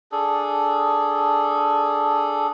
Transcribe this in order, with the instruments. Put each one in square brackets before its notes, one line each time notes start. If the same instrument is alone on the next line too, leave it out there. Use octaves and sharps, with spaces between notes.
[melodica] D4 G#4 A4